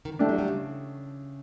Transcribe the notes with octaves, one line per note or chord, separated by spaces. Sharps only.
D#3
E3
F3 A3 D4 G4
F#3
G3
C#3